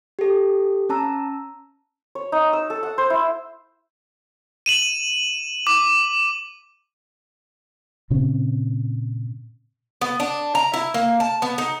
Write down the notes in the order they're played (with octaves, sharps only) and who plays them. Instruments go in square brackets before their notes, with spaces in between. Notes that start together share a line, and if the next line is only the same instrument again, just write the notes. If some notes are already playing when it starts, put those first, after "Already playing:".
[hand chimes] G4 A4
C#4 A5 A#5 E6
[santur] C#5
D#4
E6
A4
F#5
C5
E4
[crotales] D#7 E7 F#7
D6
[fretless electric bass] A#2 C#3 C4 C#4
[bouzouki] B3
D4
A#5
E4
A#3
A5
B3
D#4